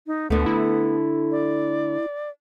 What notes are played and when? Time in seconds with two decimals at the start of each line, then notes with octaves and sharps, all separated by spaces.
0.07 D#4
0.30 D2 D3 A3 B3
0.46 E4
1.31 D5